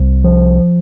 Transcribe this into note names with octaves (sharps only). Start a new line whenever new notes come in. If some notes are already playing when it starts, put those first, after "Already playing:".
Already playing: C2
F3